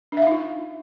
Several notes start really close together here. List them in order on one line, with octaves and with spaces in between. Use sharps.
D4 E5 F5 D#4 F4